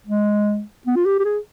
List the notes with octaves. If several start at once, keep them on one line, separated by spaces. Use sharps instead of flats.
G#3
B3
F4
G4
G4
G#4